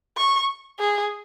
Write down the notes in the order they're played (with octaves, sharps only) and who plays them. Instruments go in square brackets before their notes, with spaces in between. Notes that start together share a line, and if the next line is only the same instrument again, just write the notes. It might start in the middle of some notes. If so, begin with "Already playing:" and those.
[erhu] C#6
G#4